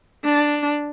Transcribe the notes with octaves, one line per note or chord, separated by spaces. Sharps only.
D4